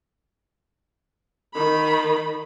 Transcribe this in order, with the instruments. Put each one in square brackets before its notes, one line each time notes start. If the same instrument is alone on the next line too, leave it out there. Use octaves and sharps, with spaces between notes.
[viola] D#3 B5